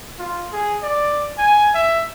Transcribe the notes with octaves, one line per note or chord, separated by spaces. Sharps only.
F4
G#4
D5
G#5
E5